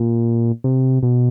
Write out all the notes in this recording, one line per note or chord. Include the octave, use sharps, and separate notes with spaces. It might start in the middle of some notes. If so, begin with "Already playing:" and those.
Already playing: A#2
C3
B2